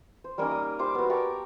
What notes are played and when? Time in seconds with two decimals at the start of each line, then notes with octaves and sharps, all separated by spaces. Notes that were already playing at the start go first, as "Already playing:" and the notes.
0.24 C5
0.38 G3 A#3 C#4 D#4
0.51 D#6
0.79 G4 C5 D6
0.95 B3 F#4
1.10 G4 A#4 A5 C#6